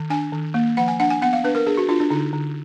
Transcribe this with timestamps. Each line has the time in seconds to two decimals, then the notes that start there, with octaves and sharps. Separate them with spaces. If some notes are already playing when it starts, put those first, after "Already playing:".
Already playing: D#3
0.10 D4 G#5
0.32 D#3
0.54 A#3
0.77 F3 F#5
0.88 G#5
1.00 D4 F#5
1.10 G#5
1.22 B3 F#5
1.33 F5
1.44 D4 B4
1.55 A#4
1.66 D4 G#4
1.77 F#4
1.89 D4 F4
2.00 D4
2.10 D3 D#4
2.33 D3